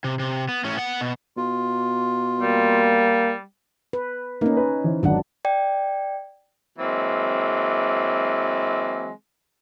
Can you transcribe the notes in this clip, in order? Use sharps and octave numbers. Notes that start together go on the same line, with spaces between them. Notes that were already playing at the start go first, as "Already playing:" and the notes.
C3
C3
B3
A2 C#4
B3 F#5
B2
B2 F4
G3 A#3
B4
A#3 C#4 D#4
B4
E3 C5
G#1 F#3 D4 F#5
D5 G5
E3 F#3 G#3 A#3 C4